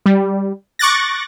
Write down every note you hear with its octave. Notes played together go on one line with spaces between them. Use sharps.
G3
C#6 D6 F#6 A6 A#6